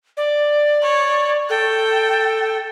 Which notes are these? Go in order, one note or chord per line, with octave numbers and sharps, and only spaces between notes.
D5
C#5
A4 G5